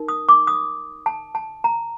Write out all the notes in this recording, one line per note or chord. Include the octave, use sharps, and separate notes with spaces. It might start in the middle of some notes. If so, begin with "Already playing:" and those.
Already playing: D#4 A#4
D#6
D6
D#6
A5
A5
A#5